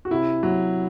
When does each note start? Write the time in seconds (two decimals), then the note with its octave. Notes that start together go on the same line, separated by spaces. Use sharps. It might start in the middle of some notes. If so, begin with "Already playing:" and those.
0.05 F#4
0.10 C3 E4
0.43 F#3